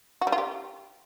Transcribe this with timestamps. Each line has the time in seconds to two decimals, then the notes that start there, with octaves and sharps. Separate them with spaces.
0.21 F#4
0.27 G3
0.32 F4
0.38 G4